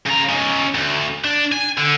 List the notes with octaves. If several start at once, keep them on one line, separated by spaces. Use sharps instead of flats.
C#3 A#5
C#4 D#4
D2
D4
G#5
D3